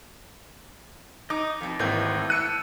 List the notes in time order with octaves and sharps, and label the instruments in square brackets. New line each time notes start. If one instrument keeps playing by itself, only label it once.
[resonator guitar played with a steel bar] D#4 [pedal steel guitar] D#5 D6 D#6
[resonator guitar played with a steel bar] F2 B2
[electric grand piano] G#1 D#2 G6 [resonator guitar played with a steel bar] A2 E3
[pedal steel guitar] A5 F#6 [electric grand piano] E6 C#7 D#7